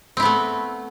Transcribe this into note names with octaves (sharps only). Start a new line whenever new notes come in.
A3 B3 C4 E4